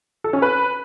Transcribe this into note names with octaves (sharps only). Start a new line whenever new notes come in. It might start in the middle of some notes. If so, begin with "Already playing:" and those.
A4
C#4
B4